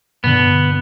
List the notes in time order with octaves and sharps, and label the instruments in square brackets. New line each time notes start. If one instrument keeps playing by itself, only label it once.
[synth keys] G2 B2 D3 [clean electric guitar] B3